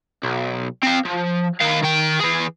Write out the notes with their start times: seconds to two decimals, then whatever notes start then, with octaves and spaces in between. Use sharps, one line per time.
0.24 B1
0.83 C4 F5
1.05 F3
1.61 D#3 F5
1.83 D#3 G5
2.20 E3 G#4